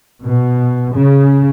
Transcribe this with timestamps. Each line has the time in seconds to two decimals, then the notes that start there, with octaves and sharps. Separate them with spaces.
0.23 B2
0.94 C#3